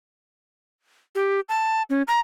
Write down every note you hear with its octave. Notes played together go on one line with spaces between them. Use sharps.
G4
A5
C#4
A#5